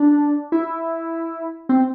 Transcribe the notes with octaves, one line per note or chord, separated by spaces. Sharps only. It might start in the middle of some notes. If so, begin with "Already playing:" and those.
Already playing: D4
E4
C4